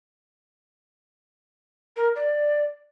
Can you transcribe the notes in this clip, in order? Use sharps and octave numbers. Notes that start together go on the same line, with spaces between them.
A#4
D5